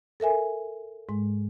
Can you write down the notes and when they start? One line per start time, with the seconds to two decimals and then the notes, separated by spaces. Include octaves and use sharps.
0.20 A4 A#4 E5 G#5
1.09 G#2 G#3